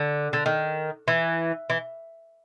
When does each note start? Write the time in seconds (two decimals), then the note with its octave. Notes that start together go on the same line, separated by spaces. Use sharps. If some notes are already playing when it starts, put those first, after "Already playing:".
Already playing: D3
0.33 D3
0.46 D#3
1.08 E3
1.70 E3